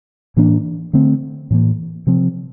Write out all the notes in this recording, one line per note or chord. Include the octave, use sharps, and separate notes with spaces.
A2 E3 A#3 D4
D3 A3 C4
A2 E3 A#3
C3 F3 C4